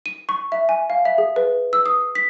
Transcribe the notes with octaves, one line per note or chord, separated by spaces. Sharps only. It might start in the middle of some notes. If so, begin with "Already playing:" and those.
D#7
C#6
E5
G#5
F5
E5
G#4
B4
E6
D#6
B6